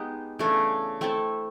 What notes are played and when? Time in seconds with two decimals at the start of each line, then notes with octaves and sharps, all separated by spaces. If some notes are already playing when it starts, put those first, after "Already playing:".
Already playing: G#3 B3 D#4 G4
0.39 C#3 E3 A3 D4
1.01 A3 C4 E4 A4